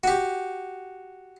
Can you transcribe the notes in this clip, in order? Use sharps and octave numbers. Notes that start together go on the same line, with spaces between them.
F#4 G4